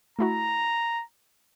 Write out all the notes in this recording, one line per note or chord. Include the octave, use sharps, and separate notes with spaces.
A3 E4 F#4 A#5